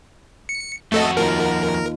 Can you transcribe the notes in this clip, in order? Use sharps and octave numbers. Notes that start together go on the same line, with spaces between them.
C#7
F2 A3 F#4 A4 D#5
D#2 F4 A#4 A5